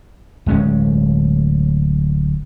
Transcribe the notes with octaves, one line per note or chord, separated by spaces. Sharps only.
D1 G#3 C#4